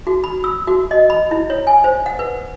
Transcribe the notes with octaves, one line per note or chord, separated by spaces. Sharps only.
F#4
B5
E6
F#4
D#5
B5
E4
C#5
G#5
C5
F#5
B4